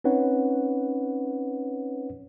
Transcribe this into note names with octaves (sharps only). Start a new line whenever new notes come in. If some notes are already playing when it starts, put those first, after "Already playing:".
C4 C#4 D#4 B4 C#5 F#5